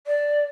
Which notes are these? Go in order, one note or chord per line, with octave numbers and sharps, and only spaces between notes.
D5